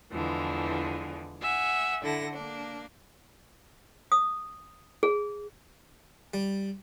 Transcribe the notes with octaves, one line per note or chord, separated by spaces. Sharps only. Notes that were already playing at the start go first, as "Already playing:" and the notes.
E2 D3 E3 F3 G#3
E5 F#5 G#5
D3 E4 A4 F#5 A#6
A#3 D4
D#6
G#4
G3